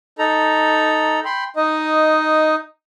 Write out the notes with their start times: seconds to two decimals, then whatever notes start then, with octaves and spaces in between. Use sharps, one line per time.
0.19 D#4 A4 A#5
1.25 G5 B5 C6
1.56 D#4 D#5